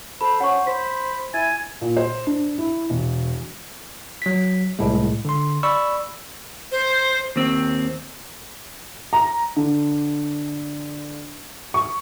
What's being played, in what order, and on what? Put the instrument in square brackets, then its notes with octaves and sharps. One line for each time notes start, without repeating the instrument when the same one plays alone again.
[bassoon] A4 [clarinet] C5 [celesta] B5
[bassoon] C#4 [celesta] F#5 C#6
[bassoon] C5 [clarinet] B5 [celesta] B6
[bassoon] E4 [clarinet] G#5 [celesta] A6
[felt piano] A#2
C5
D4
E4
E1
[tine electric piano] F#3 B6
C2 A2 G#3
D3 C6
D5 B5 C#6 E6
[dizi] C5
[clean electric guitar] D#2 C4
[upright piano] A#5
D3
C#6